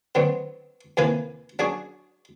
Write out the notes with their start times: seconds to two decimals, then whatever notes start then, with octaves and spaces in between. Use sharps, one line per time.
0.15 D3 F#3 B3 C4
0.97 D#2 C3 E3 A#3 B4 G#5
1.59 F#3 D4 F#4 G#4